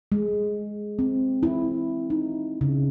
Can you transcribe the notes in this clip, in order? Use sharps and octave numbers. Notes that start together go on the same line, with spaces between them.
G#3
C4
E4
D#4
C#3